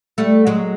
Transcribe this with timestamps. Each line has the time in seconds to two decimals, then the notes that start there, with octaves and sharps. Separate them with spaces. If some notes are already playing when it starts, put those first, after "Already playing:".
0.18 G3 A3
0.47 F#3 G#3